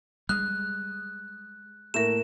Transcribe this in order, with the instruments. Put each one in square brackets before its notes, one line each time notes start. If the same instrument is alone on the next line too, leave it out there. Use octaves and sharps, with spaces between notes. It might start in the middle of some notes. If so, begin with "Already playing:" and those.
[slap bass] G3 G#3 [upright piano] D#6 F6 [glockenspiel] F#6
[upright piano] A2 A3 [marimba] A#3 A#4 [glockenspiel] E7